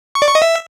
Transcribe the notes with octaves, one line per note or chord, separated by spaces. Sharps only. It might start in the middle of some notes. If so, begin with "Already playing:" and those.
C#6
D5
C#6
D#5
E5